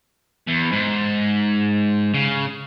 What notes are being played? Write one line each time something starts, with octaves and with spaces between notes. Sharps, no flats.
E2
G#2
C#3